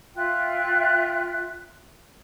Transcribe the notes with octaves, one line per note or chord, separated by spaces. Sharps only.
F4 E5 G5 F#6